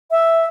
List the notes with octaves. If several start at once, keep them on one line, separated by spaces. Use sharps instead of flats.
E5